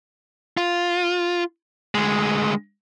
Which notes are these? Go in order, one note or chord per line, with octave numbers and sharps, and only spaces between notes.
F4
D2 G#3